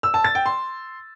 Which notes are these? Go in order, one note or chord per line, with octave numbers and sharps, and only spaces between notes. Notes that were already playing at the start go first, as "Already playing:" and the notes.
E6
A5
A6
G5
C6